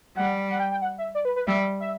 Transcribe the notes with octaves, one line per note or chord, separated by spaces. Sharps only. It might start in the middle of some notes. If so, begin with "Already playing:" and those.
G3 F#5
F#5
G5
G5
F#5
E5
D5
B4
B4
G3 E5
E5